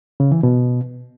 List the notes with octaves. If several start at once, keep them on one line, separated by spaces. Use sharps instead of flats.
C#3
E3
B2